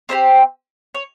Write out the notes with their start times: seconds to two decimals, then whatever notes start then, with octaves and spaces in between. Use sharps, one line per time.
0.09 C4 E4 G4 C5
0.95 C#5